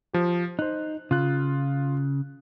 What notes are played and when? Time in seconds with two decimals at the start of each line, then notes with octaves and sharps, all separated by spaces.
0.13 F3 G4
0.59 D#4 C5 F#6
1.11 C#3 F4 F#6